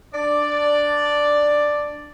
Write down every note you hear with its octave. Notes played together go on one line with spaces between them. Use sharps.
D4 D5